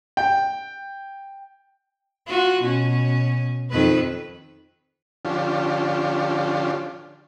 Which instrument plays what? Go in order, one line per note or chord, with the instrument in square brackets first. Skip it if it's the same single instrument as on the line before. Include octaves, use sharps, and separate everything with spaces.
[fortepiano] G5
[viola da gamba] F4 F#4
B2 C#4
F2 D#3 B4
[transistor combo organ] D3 F3 C#4 D4 F4 G4